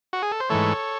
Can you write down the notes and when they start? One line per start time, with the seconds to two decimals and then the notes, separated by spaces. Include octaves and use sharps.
0.13 F#4
0.23 G#4
0.32 A4
0.40 C5
0.49 G#2 E3 A3 A4 C#5